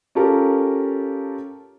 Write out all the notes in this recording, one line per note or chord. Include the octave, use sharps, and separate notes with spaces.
C#4 F4 G4 A4 A#4